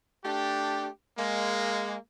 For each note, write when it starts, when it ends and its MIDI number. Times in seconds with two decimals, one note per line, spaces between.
0.24 0.88 57
0.24 0.88 62
0.24 0.88 67
1.17 1.96 56
1.17 1.96 58